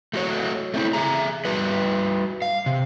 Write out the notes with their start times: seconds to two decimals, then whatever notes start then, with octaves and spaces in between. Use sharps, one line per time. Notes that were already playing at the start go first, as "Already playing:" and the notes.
0.13 A3 F#4 C#5
0.74 A3 C4 E4
0.93 G#4 E5 A#5
1.45 G3 F#4 B4
2.42 F5
2.66 C3